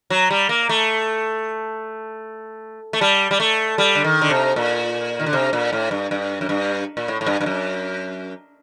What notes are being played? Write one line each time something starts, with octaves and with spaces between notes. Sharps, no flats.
F#3
G3
A#3
A3
A3
G3
G3
A3
G3
D3
D#3
D3
C3
A#2
D#3
D3
C3
A#2
A2
G2
G2
F#2
G2
A#2
A2
A2
G2
G2
F#2